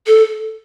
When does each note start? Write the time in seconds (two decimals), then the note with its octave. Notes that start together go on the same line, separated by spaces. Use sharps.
0.07 A4